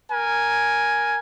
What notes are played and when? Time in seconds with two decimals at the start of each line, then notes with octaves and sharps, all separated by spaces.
0.11 A#4 G#5